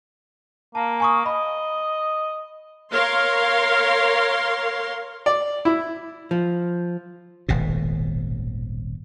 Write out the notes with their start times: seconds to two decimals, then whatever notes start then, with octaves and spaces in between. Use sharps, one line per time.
0.75 A#3 A5
1.00 G#5 C#6 D#6
1.26 D#5 B5
2.91 A#4 C#5 F5 C6
5.26 D5
5.65 E4
6.31 F3
7.49 D#1 G#1 B2